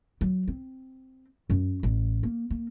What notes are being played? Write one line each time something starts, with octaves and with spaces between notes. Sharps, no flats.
F#3
C4
F#2
A1
A#3
A#3